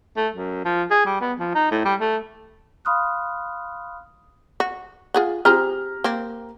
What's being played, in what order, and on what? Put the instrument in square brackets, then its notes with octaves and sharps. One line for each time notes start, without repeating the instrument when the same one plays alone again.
[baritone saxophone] A3
F#2
F3
G#4
G3
B3
F3
D#4
A2
G3
A3
[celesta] F5 B5 C6 D#6 F6 F#6
[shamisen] F#4
F4 G#4 F#5
[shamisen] C4 G#4 C5 [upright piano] G4 A#5 F6
[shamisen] A#3 C4